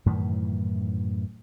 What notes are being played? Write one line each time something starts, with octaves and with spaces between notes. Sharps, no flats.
F#2 A2 D#3 E3